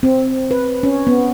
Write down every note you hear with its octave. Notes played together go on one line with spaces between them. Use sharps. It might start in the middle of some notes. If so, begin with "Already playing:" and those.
C4
B4
C#4
B3